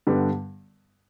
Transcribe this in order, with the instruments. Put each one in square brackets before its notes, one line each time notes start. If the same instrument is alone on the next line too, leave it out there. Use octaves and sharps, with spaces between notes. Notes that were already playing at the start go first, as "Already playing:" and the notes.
[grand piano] G2 D3 G3 B3